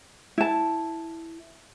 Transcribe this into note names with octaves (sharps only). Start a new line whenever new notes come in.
E4 A5